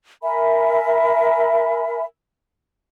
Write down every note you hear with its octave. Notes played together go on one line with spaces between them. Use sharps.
A#4 E5 G#5 B5